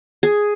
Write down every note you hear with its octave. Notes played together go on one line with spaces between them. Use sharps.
G#4